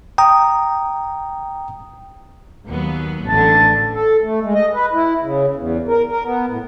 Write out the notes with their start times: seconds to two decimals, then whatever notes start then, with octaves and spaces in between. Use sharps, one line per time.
0.18 G5 A#5 D#6
2.70 D#2 F#3 B3
3.27 A1 D3 A5
3.94 A4
4.23 A3
4.42 G#3
4.54 D#5
4.74 B4
4.93 E4
5.22 C#3
5.56 E2
5.88 A#4
6.09 A#4
6.24 B3
6.48 A2